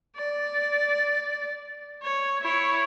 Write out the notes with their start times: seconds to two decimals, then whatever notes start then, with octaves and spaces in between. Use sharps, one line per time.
0.17 D5
2.03 C#5
2.42 E4 C#5